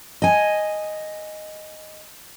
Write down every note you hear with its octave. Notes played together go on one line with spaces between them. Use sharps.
D#5 G#5